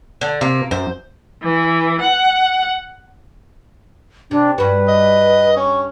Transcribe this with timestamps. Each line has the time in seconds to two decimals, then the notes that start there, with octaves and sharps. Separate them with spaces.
0.21 D3
0.41 C3 A#3
0.71 F#2 C5
1.43 E3
2.00 F#5
4.31 C3 D4
4.58 G2 F#4 B4
4.88 D#5
5.56 C#4 C#6